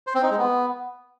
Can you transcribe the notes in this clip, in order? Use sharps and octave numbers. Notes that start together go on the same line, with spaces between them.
C5
C4
D#4
G#3
B3